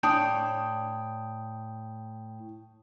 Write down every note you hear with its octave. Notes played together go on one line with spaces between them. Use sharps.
A2 D4 C#5 G5 A5 D#6